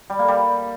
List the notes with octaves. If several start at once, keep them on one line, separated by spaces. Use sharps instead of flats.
G3
A#3
G3